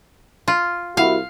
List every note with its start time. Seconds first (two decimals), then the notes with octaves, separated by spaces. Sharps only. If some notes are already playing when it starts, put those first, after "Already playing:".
0.48 F4
0.97 C2 E4 F#4 F5